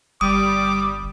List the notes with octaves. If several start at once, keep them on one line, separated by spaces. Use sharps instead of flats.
G1 G3 D6 D#6